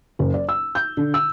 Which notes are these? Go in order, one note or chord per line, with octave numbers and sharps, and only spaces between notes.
F#1
D5
E6
G6
D3
E6